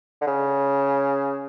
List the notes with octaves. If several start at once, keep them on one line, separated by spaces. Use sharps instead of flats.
D3
C#3